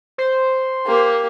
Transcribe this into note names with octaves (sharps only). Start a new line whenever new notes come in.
C5
A#3 G4